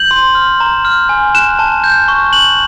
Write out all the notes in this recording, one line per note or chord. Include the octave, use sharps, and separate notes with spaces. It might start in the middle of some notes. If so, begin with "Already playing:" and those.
Already playing: G6 F#7
C6
F6
A#5
F6
G#5
F#6 E7
A5
G6
C#6
F#6 F#7